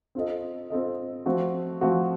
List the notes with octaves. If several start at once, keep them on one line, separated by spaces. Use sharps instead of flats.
C4 F4 A4 D#5
C4 F4 A4 D#5
F3 A3 C4 F#4
F3 A3 C4 F#4